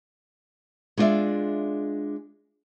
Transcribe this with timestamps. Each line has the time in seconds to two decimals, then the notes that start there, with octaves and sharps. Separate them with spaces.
0.97 G#3 D4 F4 F#4 D5 E5